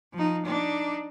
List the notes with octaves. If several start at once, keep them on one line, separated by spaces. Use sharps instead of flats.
F3 D#4
D4 D#4